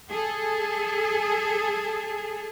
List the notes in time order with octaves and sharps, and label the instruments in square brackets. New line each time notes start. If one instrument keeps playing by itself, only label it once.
[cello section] G#4 A4